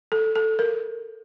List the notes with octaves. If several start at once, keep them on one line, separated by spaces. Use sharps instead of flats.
A4
A4
A#4